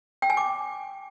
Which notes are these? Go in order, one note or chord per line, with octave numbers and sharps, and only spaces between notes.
G5
G#5
D6